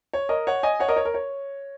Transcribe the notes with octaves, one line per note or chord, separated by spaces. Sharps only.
C#5
A#4 D#5
C#5 F#5
D#5 G#5
C#5 F#5
A#4 D#5
C#5
A#4
C#5